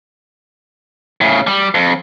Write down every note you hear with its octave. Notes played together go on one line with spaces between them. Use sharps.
A2 C#3
G3
F2